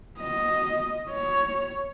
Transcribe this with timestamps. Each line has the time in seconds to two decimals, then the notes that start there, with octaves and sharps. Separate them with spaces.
0.20 D#5
1.10 C#5